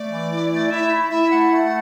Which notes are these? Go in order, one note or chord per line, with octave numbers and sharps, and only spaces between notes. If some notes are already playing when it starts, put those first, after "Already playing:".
Already playing: A3 D5
E3
E4
A3
E4 E5
E4
E4 E5
A3 F#5
A3